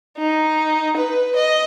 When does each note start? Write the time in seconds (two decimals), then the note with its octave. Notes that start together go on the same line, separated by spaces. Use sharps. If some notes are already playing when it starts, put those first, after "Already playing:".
0.18 D#4
0.97 B4
1.36 D#5